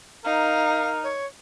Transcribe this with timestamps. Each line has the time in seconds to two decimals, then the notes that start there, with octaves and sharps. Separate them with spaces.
0.25 D#4 A#4 F5
1.03 C#5